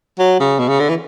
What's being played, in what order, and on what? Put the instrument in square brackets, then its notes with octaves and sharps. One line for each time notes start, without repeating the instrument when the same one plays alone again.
[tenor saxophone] F#3
C#3
B2
C#3
D3
E3